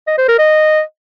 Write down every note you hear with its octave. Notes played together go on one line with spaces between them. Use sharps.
D#5
C5
A#4
D#5